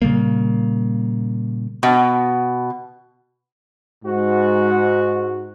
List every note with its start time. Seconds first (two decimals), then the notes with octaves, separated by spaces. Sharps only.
0.02 A#2 C#3 G3 A#3
1.83 B2
4.05 G#2 F#4